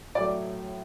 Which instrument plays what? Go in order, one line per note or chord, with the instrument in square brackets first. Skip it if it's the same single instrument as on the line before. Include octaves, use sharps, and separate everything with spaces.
[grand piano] A2 F#3 A3 D5